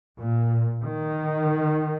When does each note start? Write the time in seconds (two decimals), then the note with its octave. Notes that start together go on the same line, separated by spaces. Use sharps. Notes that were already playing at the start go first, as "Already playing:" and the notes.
0.18 A#2
0.84 D#3